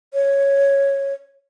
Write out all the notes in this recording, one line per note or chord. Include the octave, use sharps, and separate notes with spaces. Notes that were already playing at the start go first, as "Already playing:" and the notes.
C#5